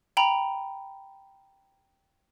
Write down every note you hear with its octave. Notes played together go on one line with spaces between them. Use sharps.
G5 A#5 B5 F7